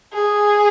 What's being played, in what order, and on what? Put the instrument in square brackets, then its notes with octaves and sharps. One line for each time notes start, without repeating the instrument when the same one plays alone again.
[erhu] G#4